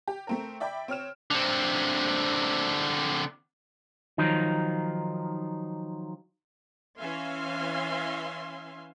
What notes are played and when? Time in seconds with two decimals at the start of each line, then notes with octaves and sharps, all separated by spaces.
0.08 G4
0.27 A3 C4 A#4
0.60 D5 E5 G5 B5 D6
0.88 C4 C#5 F6 E7
1.30 D3 C4
4.18 D#3 F3 F#3 D#4
6.98 E3 C#4 E5 F5 G#5 C6